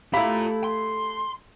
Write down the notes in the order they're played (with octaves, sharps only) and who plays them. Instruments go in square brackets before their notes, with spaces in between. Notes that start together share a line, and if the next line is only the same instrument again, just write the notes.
[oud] A3 G4 [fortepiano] E4 B5 [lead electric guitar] F4 A#5 [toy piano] F5
[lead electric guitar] C6